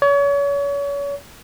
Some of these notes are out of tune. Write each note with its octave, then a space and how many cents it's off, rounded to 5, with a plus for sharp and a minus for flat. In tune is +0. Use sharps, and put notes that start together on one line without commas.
C#5 +35